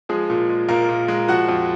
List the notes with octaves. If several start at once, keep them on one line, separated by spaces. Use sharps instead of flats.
F3 G#3 G#4
A#2
G#3
A#2 A#3 A#4
A#2
G#3
F3 F#4 F#5
F2